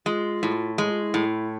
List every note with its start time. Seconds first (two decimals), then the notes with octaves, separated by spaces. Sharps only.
0.06 G#3 F4
0.43 A2
0.78 G#3 E4
0.91 F4
1.02 E4
1.14 A2